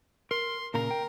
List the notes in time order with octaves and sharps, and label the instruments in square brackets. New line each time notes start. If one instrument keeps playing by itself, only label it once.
[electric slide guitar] A#4 [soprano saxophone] C6
[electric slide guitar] A#2 C#3 A#5 [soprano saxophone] A#4
[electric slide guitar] G5